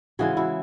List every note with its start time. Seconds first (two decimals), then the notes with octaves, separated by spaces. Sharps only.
0.19 C#3 E3 G#3 F#4 G#4
0.37 E4 F#4